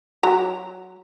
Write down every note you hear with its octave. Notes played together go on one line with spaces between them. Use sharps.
F#3 A#5